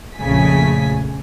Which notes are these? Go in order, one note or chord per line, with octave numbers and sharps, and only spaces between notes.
A#1 F2 C#3 A3 G#5 B6